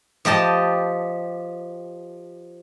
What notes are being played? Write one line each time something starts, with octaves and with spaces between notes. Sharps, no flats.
F3 G4 D#5 A5